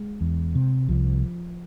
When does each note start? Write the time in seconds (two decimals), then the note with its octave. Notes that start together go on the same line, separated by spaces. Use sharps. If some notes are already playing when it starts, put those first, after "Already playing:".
Already playing: G#3
0.21 E2
0.55 C3
0.88 C2 F3